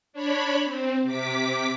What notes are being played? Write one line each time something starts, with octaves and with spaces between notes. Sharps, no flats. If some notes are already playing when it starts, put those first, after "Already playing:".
D4 C#5 B5
C4
C3 D6 B6